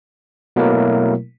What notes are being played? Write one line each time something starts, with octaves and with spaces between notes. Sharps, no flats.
B2 F#3 A3 A#3 E4 A#4